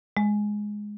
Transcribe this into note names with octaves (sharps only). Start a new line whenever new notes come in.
G#3